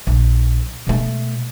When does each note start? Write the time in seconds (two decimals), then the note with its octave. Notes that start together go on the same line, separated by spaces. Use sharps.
0.07 A#1
0.87 B2 A3